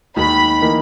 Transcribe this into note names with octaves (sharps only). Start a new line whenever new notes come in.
D#2 D#3 G#3 D#4 B5
E3 A#3 D#4